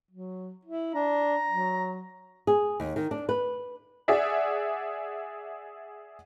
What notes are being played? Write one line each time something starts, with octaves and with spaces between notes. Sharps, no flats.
F#3
E4
D4 A#5
F#3
G#4
D#2
D#3
D4
B4
G#4 D5 E5 F#5